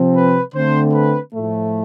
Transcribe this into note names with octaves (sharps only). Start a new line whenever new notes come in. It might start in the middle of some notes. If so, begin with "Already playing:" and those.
Already playing: C3 F3 C4
B4
D3 A3 C4 C5
B4
A2 F3 A3